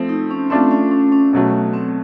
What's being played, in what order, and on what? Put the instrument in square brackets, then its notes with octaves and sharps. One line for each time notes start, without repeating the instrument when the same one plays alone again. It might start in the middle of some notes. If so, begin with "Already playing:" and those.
Already playing: [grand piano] F3 A3 C4
[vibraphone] D#4
C#4
[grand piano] A3 D4 F4 [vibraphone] C4
[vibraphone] C#4
C#4
C#4
[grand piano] B2 F#3 A3
[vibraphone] C4